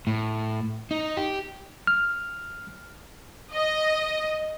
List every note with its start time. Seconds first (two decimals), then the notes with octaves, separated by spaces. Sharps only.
0.07 A2
0.91 D#4
1.17 G4
1.87 F6
3.53 D#5